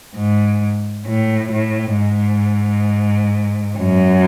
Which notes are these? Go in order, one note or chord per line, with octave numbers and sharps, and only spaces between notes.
G#2
A2
A2
G#2
F#2